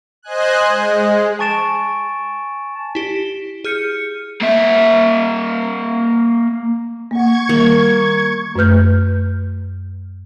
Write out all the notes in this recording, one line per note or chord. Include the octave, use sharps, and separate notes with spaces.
C5 D#5 G#5 F#6
G#3
G#5 A5 C#6 A6 D7 E7
E4 G4
G#4 F6 G6 C#7
A#3 E5
A#3 F#5 C#6 G#6
D#3 G3 A#3
F#2 A3 B4 F6 G6